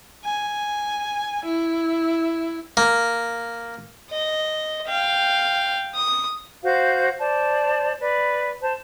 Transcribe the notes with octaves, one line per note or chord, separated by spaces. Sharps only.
G#5
E4
A#3
D#5
F5 G5
D#6
F#4 C5 F5 G6
C5 D5 A5
B4 D5
C5 A5